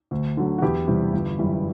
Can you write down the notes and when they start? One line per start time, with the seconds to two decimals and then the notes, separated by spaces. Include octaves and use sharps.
0.11 D2
0.37 D3 F#3
0.58 F#4
0.62 E2 E4 G4
0.88 C3 E3 G3
1.13 G1
1.39 F#2 E3 G3